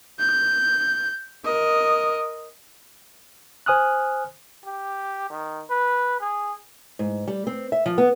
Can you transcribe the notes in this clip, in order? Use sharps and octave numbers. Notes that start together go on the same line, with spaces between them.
G6
A#4 D#5
C5 G#5 D#6 F6 F#6
G4
D#3
B4
G#4
G#2
G3
C4
E5
F3
B3